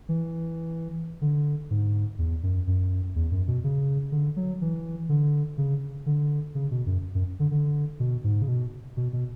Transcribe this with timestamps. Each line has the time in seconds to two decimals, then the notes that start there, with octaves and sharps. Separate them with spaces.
0.09 E3
1.22 D3
1.71 G#2
2.19 E2
2.43 F#2
2.67 F#2
3.15 E2
3.32 F#2
3.48 B2
3.64 C#3
4.12 D3
4.36 F#3
4.61 E3
5.09 D3
5.58 C#3
6.06 D3
6.55 C#3
6.71 B2
6.87 F#2
7.15 F#2
7.40 D3
7.51 D3
8.00 B2
8.24 G#2
8.42 C#3
8.48 B2
8.97 B2
9.13 B2